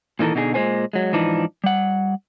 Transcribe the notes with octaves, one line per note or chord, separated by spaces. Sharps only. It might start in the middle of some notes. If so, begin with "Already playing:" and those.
A#2 D#3 E3 A4 A#4
B2 D3 D#4 F4 G#4
A#2 G#3 D4 B4 C5 G#5
F#3 G#3
G#2 E3 F3 D4 D#4
G3 F#5